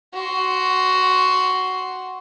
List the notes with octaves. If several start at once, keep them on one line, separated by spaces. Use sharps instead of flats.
F#4 C6